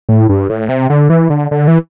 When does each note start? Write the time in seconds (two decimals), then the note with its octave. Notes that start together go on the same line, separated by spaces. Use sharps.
0.09 A2
0.29 G2
0.49 A2
0.69 C3
0.90 D3
1.10 E3
1.30 D3
1.51 D3
1.68 E3